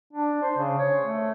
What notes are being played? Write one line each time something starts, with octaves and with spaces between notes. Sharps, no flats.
D4
C5
C#3
C#5
A3